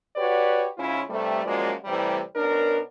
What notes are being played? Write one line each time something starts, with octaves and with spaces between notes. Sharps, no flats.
F#4 G4 B4 C#5 D5
G#2 C#3 C#4 E4 F4
G2 C3 G3 A3
F#2 F3 G#3 A#3 F#4 D5
A2 C3 E3 G3
B2 C#4 D4 A#4